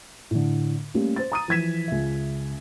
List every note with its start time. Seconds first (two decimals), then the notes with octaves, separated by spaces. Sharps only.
0.31 A2 D3
0.94 G3 A3 A#3 C#4 G4
1.16 C5 A6
1.32 A#5 D#6 D#7
1.48 E3 F3 G#6 B6 E7
1.88 C#2 E5